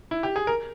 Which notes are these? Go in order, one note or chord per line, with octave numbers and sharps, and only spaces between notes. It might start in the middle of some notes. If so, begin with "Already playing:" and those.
E4
G4
G#4
A#4